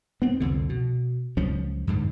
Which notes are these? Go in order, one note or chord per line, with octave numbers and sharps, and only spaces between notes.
B3 C4
C2 F2 D3
B2
C#2 F3 F#3 C#4
F2 G#2 D3